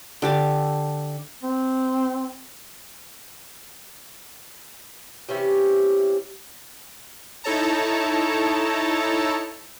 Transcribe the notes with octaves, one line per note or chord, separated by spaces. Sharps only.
D3 G4 A5
C4
C3 E3 C#4 G4
D#4 E4 A4 C#5 A5 A#5